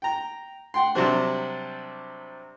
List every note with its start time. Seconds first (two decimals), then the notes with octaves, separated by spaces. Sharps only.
0.02 G5 A#5
0.74 F#5 G5 C6
0.95 C3 F#3 G3 C4 D4